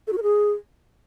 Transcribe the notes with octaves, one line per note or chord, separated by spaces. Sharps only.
A4
F#4
A#4
G#4